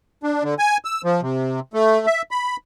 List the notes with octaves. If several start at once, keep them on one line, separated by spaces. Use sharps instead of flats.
D4
D3
G#5
E6
F3
C3
A3
E5
B5